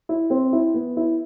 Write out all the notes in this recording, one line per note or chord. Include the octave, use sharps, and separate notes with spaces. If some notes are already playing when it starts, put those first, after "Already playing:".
E4
C4
E4
B3
E4